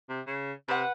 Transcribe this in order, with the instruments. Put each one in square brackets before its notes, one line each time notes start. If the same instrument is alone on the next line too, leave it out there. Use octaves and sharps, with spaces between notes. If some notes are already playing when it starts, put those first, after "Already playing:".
[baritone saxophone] C3
C#3
[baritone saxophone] C3 [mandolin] B4 F#5